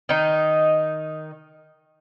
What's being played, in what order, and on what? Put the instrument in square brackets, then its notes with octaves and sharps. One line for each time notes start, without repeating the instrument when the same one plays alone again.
[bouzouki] D#3 D#4